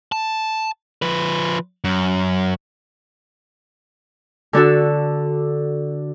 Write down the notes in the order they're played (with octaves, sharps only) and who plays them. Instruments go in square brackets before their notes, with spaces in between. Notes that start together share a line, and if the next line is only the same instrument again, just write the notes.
[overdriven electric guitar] A5
F3 B4
F#2
[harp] D3 D4 F#4 A4